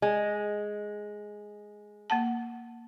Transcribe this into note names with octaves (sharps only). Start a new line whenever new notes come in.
G#3
A#3 F#5 A5